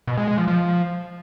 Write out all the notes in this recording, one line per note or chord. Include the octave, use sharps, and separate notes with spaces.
B2
G#3
G#3
F3
F3